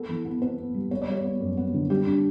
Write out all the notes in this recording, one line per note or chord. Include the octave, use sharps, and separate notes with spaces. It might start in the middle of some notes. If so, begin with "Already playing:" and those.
Already playing: B3 A4
E3
B3
B3 B4
B3
G3
B3 C#5
D5
G3 C#5
B3
F#2
B3
D3
G3 G4
D4